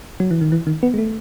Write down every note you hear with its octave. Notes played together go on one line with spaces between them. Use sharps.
F#3
E3
D#3
E3
D#3
B3
G#3
A3